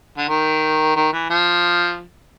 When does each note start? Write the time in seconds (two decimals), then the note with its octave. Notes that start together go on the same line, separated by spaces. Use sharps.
0.18 D3
0.28 D#3
0.96 D#3
1.13 E3
1.30 F3